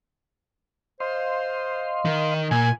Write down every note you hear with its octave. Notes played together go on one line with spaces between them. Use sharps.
C5 D#5 F5 C6
D#3
A#2 G#5